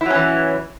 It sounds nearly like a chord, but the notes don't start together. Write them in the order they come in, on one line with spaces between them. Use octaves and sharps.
E4 F#3 C#4 E3